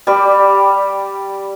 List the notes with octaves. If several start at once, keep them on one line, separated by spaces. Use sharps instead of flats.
G3 G4 D5